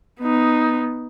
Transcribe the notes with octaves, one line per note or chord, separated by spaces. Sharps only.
B3 D#4